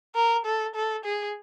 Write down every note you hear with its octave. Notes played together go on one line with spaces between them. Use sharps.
A#4
A4
A4
G#4